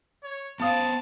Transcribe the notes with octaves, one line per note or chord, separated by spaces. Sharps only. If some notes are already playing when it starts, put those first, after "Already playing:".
C#5
B3 C5 F5 A5 D#6